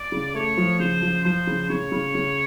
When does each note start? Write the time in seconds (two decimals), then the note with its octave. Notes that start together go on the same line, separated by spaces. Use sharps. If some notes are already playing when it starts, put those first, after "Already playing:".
Already playing: D5
0.12 C#3
0.34 A3 C#5
0.57 F3
0.80 C#3 C5
1.02 F3
1.25 F3 C5
1.47 C#3
1.70 C#3 C#5
1.92 C#3
2.15 C#3